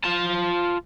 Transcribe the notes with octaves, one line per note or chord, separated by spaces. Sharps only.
F4 A5